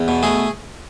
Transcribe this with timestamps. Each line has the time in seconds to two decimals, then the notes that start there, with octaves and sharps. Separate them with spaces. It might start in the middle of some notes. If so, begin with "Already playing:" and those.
Already playing: E2
0.08 B2
0.23 A3 G#4